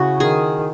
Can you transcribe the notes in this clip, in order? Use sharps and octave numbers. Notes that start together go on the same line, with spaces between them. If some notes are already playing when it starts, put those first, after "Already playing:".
Already playing: C#3 E4 F#4
D#3 G#4